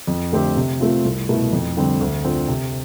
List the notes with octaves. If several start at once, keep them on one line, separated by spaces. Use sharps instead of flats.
F2
D3 A3 C4 G4
C3
F3 A3 C4 F4
C2
B2 A3 E4
F2
D3 G3 C4
D2
D3 F3 C4
C3